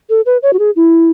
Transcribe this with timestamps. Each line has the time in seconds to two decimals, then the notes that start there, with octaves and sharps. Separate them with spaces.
0.10 A4
0.26 B4
0.42 C#5
0.53 F#4
0.59 G#4
0.76 E4